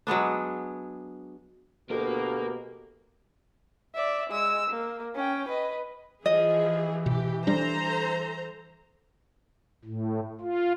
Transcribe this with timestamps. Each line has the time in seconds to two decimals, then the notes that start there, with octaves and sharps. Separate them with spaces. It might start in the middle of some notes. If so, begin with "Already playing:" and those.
0.07 F#3 G#3 B3 D4
1.90 D2 B2 A#3 G4 A#4
3.94 D5 E5
4.30 G#3 E6
4.69 A#3
5.15 C#4 G5
5.48 B4 D#5
6.26 E3 F3 G#4 D#5
7.06 B2 G4
7.47 G3 D4 A4 C5 A#5
9.85 A2
10.41 F4